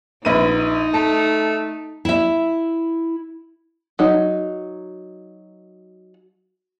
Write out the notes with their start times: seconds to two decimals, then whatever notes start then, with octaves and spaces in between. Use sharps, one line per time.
0.25 A#1 D#4 B4 D#7
0.94 A3 A5
2.05 E4 E5
3.99 F#3 D#4